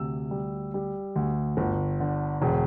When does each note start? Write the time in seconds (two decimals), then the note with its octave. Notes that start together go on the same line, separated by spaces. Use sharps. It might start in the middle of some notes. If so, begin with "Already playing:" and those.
Already playing: D2 C3 E6
0.31 G3
0.74 G3
1.16 D2
1.57 G1
2.00 D3
2.42 E1